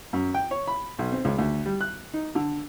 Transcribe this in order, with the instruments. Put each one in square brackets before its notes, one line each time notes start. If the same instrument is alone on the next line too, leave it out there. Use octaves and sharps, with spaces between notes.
[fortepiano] F#2
G5
C#5
B5
B1
C4
C#2
D2
G3
F#6
D#4
D3